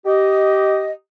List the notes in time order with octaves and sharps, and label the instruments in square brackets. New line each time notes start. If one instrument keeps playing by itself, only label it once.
[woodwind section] G4 D#5